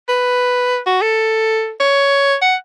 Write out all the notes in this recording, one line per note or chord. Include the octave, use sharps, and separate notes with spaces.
B4
F#4
A4
C#5
F#5